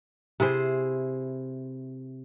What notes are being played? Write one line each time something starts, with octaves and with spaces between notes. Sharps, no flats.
C3 E4 G#4 C5